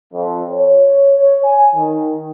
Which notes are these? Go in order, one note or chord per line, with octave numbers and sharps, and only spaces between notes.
F2
C#5
C#5
G#5
D#3